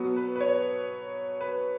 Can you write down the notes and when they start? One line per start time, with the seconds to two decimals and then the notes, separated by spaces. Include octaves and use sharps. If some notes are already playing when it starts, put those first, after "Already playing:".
Already playing: B2 F#3 B3
0.16 B4
0.36 B4
0.41 C#5
1.41 B4